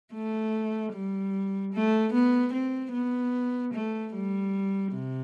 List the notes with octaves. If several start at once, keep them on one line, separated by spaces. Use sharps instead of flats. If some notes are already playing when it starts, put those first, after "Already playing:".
A3
G3
A3
B3
C4
B3
A3
G3
C3